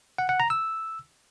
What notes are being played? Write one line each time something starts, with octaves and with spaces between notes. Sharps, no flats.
F#5
F#5
A#5
E6